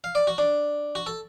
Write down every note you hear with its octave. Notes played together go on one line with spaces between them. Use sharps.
F5
D5
F#4
D4
F#4
A4